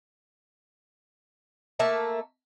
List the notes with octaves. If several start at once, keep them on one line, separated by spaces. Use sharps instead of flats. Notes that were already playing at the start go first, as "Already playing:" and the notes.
A3 A#3 E5 A5